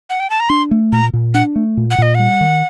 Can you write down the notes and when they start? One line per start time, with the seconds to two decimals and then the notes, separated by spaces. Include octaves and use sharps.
0.10 F#5
0.20 G5
0.30 A5
0.40 A#5
0.49 D4 C6
0.71 A3
0.92 A#2 A#5
1.13 A#2
1.34 D4 F#5
1.56 A3
1.77 A#2
1.91 F#5
1.98 A#2 D#5
2.15 G3 F#5
2.41 D#3